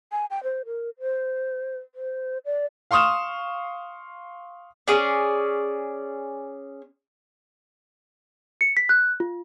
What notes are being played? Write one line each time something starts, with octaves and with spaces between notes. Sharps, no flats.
G#5
G5
C5
A#4
C5
C5
D5
F5 C6 C#6 D#6 F6 E7
C#4 G#4 D5
C#7
B6
F#6
F4